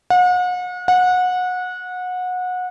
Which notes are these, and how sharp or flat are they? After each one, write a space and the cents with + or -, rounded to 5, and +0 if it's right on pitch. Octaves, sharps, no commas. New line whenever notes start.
F#5 -40
F#5 -25